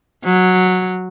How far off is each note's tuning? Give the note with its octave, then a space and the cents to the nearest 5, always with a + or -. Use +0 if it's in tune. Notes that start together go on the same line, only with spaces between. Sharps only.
F#3 -10